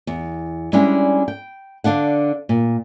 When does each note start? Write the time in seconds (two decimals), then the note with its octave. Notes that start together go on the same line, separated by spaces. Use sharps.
0.07 E2
0.73 G3 G#3 C#4 D4 E4
1.28 G5
1.84 D3 D4 F5 F#5
2.49 A#2